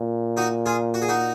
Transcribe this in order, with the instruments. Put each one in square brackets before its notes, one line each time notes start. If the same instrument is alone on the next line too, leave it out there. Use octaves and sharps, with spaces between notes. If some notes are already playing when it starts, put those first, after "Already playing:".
Already playing: [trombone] A#2
[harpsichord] D#4 F#4
F4 G#4
F#4
G#4
D#4 F#4